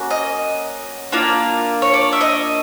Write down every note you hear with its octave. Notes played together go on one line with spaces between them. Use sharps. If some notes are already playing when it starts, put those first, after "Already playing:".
Already playing: A#3 C#4 F#4
D#5
A#3 D4 F4
C#5
D5
E5
D#5